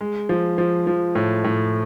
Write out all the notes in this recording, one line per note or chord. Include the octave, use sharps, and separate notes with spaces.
G#3
F3
F3
F3
A2
A2